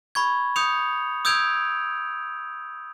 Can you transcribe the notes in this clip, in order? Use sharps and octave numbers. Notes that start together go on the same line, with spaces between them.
B5 C#6 G#6
D#6 G6 C#7 F7
D#6 E6 G6 G#6 D7 F7